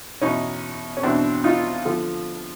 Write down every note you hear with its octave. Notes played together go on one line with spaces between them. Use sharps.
E2 B2 C#4 D#4
C#4
E2 B2 C4 D4
D#4 F4
D3 F3